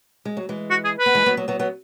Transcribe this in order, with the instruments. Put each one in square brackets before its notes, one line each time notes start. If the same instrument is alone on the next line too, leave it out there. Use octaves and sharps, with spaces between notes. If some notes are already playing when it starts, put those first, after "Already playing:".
[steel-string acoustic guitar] G#3
F#3
E3 G#3
[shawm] F#4
G#4
B4
[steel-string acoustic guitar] B3
E3 G#3
F#3 B3
F#3 B3
F#3 B3
F#3 B3